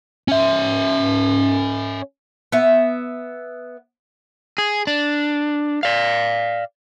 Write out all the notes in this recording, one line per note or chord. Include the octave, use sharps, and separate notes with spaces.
C#4 E5
B3 E5
G#4
D4
D5 F5